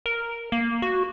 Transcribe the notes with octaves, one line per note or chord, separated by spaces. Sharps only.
A#4
A#3
F#4